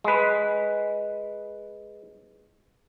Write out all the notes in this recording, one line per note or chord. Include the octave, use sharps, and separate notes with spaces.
G#3 B4